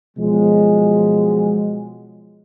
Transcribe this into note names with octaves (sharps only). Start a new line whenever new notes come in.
B2 F3 F#3 G#3